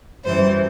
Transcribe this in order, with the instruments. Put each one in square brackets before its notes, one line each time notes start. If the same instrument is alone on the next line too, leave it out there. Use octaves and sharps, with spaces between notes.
[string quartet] F#2 E3 G3 C5